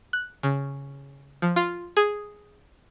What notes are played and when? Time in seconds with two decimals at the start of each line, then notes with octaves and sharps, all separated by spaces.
0.13 F#6
0.43 C#3
1.42 F3
1.56 F4
1.97 G#4